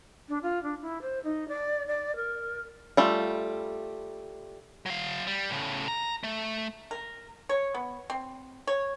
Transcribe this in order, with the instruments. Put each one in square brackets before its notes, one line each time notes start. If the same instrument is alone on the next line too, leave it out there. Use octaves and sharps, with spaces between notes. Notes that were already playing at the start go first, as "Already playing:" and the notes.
[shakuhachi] D4
F4
D4
E4
C5
D#4
D5
D5
A#4
[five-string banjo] G3 A3 F4
[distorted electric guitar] F#3 F5
G3
A2 C#3
A#5
A3
[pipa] A#4
C#5
B3
C4
C#5